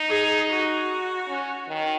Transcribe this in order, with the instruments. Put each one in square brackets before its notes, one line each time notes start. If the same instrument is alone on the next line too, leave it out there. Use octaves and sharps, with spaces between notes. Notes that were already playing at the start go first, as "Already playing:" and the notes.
Already playing: [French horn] D#4
[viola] G#4
F#4
[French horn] C#4
D#3